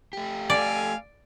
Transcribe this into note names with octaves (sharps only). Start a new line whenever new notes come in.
A3 G4
A4 D5 F5 G#5